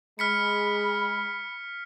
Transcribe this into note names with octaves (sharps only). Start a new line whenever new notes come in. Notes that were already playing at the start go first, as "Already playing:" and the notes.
G#3 B5 F6 B6 C#7